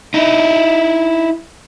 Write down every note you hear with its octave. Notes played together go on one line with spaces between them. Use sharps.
D#4 E4